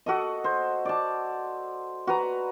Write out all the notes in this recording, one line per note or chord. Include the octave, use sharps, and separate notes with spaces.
F#4 A4 D#5
C5
D5 A5
F#4 B4 A#5